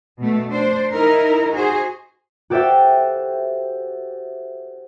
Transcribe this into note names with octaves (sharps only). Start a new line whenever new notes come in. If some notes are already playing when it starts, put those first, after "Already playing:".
B2 A3
D4 C5
D#4 E4 A#4 D#5
F#4 G#4 C5
F#4 G4 A4 C5 E5 G5